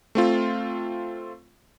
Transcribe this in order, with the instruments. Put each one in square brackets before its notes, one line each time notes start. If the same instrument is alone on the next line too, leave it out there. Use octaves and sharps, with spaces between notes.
[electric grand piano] A3 C4 F4